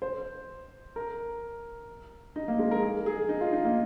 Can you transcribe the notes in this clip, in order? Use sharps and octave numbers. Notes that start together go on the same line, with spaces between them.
C5
A#4
D#4
A#3
G#3
A#4
G#4
G#4
D#4
F4
D#4
A#3